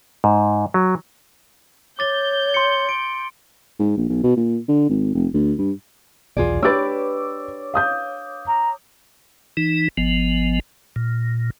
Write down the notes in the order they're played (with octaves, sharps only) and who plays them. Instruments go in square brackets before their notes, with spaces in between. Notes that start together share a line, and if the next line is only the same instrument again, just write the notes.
[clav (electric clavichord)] G#2
F#3
[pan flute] C#5 [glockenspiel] D6 A6 G7 [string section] G6
[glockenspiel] C6 C#7
D7
[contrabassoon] G#2
A#1
B1
B2
A#2
D3
G#1
F1
D2
G2
[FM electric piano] B1 E2 [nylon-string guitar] F4 G#4 D5
[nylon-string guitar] D4 G4 B4 [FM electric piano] C#5 D6 [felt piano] E6 A6
[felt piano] F5 D#6 G6
[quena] A#5
[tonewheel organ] E3 D#4
G#1 F3 B3
A#2